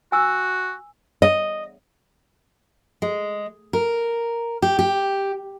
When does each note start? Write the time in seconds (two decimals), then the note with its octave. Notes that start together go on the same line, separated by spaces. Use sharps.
0.12 F#4 G#5 E6
1.22 D#5
3.02 G#3
3.73 A#4
4.62 G4
4.79 G4